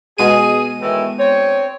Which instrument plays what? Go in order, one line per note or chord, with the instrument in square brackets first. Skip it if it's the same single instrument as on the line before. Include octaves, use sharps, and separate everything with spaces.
[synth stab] B2 G#3 D#7 [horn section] G#4
[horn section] A2 D#3 E3
C4 D4 C#5